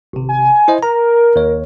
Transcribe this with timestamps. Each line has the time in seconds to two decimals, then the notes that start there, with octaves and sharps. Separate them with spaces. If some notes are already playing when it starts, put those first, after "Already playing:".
0.13 G#1 C3
0.29 G#5
0.68 E4 C5 D#5
0.83 A#4 A#5
1.36 D#2 C#5